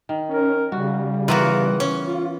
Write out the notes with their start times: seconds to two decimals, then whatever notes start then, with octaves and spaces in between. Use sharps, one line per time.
0.09 D#3
0.29 C#4 A#4
0.72 C#3 G3 F#4
1.28 E3 B3 F4 F#4 A#4 F#5
1.80 C#4
2.07 F4